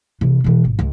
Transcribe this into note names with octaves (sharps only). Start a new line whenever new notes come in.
C3 E3
B2 E3
G#1
C#2